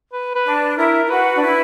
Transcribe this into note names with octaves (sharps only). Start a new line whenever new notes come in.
B4
B4
D4
E4 A#4
E4
F#4 B4
D4
E4